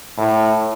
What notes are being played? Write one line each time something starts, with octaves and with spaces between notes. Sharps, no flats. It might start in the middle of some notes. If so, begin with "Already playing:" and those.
A2